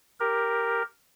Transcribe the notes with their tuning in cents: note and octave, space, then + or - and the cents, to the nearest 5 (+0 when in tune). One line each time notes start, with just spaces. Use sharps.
G4 +0 A#4 +0